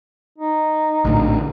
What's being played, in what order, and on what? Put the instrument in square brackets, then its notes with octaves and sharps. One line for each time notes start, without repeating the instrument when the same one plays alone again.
[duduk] D#4
[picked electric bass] A#1 A2 D3